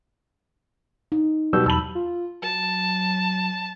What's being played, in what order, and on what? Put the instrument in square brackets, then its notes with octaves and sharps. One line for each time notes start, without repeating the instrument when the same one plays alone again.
[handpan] D#4
[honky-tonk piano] B2 G3 [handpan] F#3 [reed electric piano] E6 G6
[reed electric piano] E2 A5 B5 [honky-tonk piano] E6 F#7
[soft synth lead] F4
[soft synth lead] F#3 [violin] A5